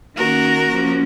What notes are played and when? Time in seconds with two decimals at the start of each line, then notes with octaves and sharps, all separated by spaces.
0.16 D#3 A#3 C#4 F#4 A#4
0.68 F3 A#3 C#4